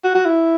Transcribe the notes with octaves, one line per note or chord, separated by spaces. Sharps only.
F#4
F#4
E4